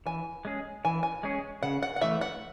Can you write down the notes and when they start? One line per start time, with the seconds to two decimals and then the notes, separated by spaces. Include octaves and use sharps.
0.06 E3 G#5
0.45 G#3 C#4 G#4
0.85 E3 G#5
1.03 G#5
1.23 G#3 C#4 G#4
1.63 C#3 F#5
1.83 F#5
1.96 F#5
2.01 E3 A3 E5
2.21 F#5